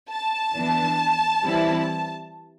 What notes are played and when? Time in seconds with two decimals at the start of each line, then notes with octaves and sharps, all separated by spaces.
0.10 A5
0.55 E3 B3 D4
1.44 E3 G3 C4 E4